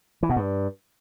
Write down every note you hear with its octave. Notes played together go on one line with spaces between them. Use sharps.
E3
B2
G2